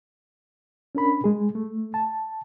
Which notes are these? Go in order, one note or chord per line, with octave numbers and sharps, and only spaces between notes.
C#4 D4 A#4 B5
G#3 G#4
A3
A5